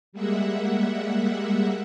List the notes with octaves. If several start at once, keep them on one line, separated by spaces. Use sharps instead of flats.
G3 G#3 A#3 E5 F#5